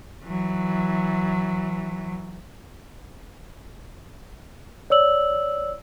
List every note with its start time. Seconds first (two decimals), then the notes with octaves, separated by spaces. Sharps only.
0.24 E3 F#3
4.90 C#5 D5 E6 F#7